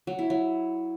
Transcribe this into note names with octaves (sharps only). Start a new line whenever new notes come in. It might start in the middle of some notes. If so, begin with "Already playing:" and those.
F#3
E4
F#3